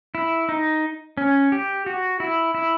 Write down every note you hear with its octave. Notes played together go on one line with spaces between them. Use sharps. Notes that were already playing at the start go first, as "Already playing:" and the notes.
E4
D#4
C#4
G4
F#4
E4
E4